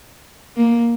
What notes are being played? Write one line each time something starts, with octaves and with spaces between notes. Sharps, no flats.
A#3